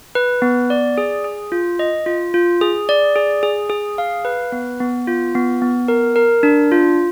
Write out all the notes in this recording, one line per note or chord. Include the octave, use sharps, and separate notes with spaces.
B4
B3
D5
G#4
G#4
F4
D#5
F4
F4
G#4
D5
G#4
G#4
G#4
F5
B4
B3
B3
F4
B3
B3
A#4
A#4
D4
F4